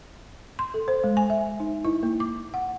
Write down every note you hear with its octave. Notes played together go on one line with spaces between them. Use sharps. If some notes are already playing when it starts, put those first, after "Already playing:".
C6
A4
C5
G#3
G#5
E5
D#4
E4
A#3
D6
F#5